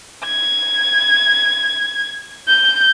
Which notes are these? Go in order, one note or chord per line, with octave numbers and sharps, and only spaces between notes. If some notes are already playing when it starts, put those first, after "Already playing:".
G#6
G6